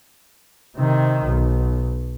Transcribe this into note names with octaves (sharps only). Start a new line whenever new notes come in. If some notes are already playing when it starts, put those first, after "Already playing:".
C3 D#3
B1